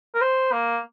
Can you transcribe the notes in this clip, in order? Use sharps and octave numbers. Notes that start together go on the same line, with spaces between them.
A#4
C5
A#3